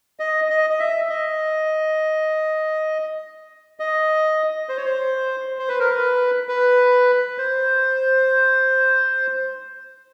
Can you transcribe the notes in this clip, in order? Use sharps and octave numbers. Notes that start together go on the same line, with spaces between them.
D#5
D#5
D#5
E5
D#5
D#5
C5
C#5
C5
C5
B4
A#4
B4
B4
C5